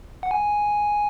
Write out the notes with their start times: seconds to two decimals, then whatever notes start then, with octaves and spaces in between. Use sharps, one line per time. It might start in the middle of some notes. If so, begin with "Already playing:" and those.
0.23 F#5
0.31 G#5